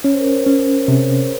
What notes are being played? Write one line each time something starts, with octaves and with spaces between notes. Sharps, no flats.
C#4 C#5
C5
A#4
C5
C#4
C3 G#4